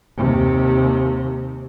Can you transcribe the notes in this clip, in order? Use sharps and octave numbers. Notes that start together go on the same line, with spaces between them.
D#2 C3